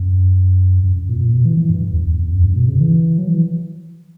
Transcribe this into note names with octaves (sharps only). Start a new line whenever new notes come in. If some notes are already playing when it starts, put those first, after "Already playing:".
Already playing: F#2
F#2
F#2
A#2
A#2
B2
E3
E3
G2
G2
E2
E2
E2
F#2
G2
B2
C#3
E3
F#3
E3